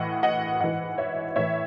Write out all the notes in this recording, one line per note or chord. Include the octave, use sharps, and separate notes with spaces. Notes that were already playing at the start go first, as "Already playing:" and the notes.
Already playing: A2 E3 D#5 F#5
D#5 F#5
G#2 E3 D#5 F#5
C#5 E5
A2 E3 C#5 E5